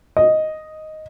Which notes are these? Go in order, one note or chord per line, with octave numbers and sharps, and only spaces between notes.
D#5